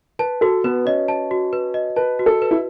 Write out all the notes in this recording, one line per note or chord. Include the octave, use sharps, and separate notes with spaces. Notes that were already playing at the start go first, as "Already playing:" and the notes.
B4 A5
F#4 A4
B3 B4
C#4 D#5
A5
F#4
B4
D#5
B4 A5
F#4
A4
B4
E4